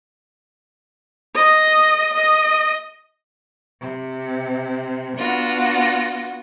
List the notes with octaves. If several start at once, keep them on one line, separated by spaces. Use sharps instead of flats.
D#5
D#5
C3
B3 D4 F4 F#4